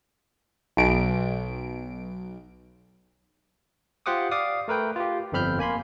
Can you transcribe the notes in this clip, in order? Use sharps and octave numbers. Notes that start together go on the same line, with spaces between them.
B1 D7
F4 G4 C5 F#5 D6 D#6
D5 F5 D6 D#6
A3 A#4 B4 G5
F4 G4
G1 F2 C4 B5 F6 G6
A#3 G#5 B5 C6